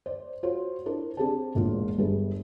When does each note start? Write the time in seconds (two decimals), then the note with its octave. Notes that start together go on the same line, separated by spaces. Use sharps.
0.06 C5 D5
0.43 F4 F#4 C5 C#5
0.86 D4 E4 A#4 C5
1.17 C4 D4 G4 G#4 C5 A5
1.55 E1 A1 A#3 D4 F4
1.98 G1 G3 D4 G#4 B4